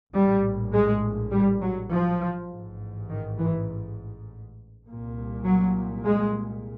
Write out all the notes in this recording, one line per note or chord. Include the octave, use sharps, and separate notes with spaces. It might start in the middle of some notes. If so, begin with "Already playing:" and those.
A#1 A2 G3
G#3
G3
F#3
F3
A1 G#2
D#3
E3
C2 A#2
F#3
G#3